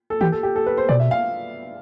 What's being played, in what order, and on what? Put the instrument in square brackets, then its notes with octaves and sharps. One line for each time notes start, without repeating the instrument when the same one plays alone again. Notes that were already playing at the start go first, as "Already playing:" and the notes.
[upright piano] A4
[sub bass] E3 [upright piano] G4
[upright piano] A4
G4
A4
B4
C5
[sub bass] B2 [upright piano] D5
[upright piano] E5
F5